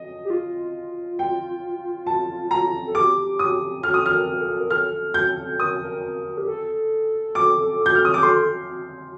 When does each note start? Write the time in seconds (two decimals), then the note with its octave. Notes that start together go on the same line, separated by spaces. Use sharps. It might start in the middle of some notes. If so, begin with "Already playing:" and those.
Already playing: D#5
0.25 G4
0.30 F4
1.19 G5
2.07 A5
2.51 A#5
2.87 A4
2.95 G4 D6
3.39 D#6
3.83 A4 F6
3.94 D#6
4.05 A4 F6
4.13 A#4
4.34 A#4
4.41 A4
4.60 A#4
4.70 A4 F6
5.14 G6
5.59 A#4 D#6
5.82 A#4
6.38 G4
6.48 A4
7.35 D6
7.86 G6
7.95 F6
8.05 D#6
8.14 G4 D6
8.23 A4 C6